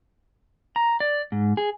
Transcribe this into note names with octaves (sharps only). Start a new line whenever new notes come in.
A#5
D5
G#2
G#4